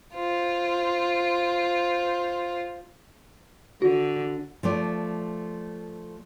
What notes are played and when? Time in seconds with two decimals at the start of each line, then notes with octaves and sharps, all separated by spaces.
0.14 F4 C5
3.82 D3 F#4
4.63 F3 A3 D5